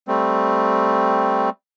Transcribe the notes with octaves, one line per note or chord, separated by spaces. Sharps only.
G3 A3 C4